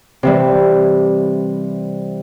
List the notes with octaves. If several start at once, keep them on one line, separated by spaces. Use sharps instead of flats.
C3 E3 G3